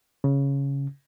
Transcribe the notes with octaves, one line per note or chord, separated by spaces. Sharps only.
C#3